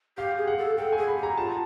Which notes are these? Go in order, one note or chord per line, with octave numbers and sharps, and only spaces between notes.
G4 F5
G#4
F#5
A4
A4 G5
G#4 G#5
B5
G4
A#5
F4 A5